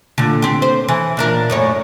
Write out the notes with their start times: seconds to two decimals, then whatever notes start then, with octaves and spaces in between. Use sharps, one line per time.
0.18 A#2 D3
0.42 C4 G4
0.62 C5
0.88 E3
1.17 A#2 D4 A#4
1.50 F#2 A2 C#5